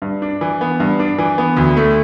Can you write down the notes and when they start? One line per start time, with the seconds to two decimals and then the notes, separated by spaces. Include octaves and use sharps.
0.02 G2
0.22 D4
0.41 E3
0.61 B3
0.80 G2
0.99 D4
1.18 E3
1.38 B3
1.57 D2
1.77 A3